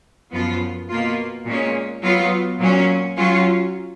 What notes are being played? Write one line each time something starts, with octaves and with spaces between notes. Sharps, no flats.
F#2 F3 B3 F4
B2 A#3 F4
A#2 G#3 C#4
F#3 B3 F4
A#2 F#3 C#4
F#3 C#4 F4